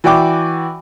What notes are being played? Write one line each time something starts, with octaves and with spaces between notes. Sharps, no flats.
E3 F#4 D5 G5 D6